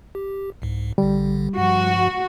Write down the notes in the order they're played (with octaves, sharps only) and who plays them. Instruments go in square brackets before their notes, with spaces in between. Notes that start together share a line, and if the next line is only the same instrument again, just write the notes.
[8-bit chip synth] G4
C2 G#2
[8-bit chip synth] A#1 D3 [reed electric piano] G3
[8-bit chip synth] G2 F3 [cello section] F#4